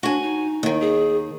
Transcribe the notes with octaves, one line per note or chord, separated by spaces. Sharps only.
D4 F#4 G#5
D#4
D#2 D#3
G#4